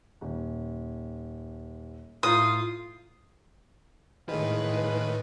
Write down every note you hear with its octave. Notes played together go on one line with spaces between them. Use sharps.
D#1
A2 F4 A#5 D#6 G6
A2 D#3 G#3 E4 B4 F5